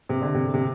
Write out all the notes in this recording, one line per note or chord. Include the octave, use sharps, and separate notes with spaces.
C3
D3
C3
C3